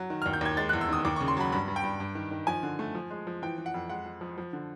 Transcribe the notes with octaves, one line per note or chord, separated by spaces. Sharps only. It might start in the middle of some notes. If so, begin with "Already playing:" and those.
Already playing: F#3
D#3
D#2 F6
G6
D#2 G#6
G#3 A6
E2 F#6
E6
D#3 D#6
D#2 D6
C#3 C#6
C6
F#3 B5
G2 B5
G2
G5
G2
G2
D#3
D#3
F3 G#5
D3
A3
F3
G#3
F3
E3 G5
E3
F#5
F2
G#3 F#5
F3
F3
F3
D3